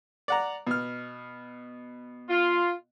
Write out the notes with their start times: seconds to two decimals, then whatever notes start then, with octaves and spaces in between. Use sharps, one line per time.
0.28 D5 F#5 A#5
0.67 B2 F6
2.28 F4